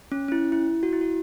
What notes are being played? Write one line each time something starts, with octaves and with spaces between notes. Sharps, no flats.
C#4
C#4
E4
E4
F#4
E4
F#4